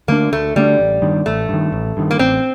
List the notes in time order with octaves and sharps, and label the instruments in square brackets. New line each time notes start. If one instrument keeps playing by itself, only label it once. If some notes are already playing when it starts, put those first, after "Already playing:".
[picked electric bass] D3 A3 D4 [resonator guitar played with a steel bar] A#3
[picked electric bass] D2 [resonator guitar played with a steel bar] A3
[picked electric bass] D3 A3 D4 [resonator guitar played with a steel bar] G3
[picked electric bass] A1
G2 D#3
[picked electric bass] A1 [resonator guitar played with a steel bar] A3
[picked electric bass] G2 D#3
A1
G2 D#3
[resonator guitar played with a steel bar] A#3
[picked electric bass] A1 [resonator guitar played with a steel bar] C4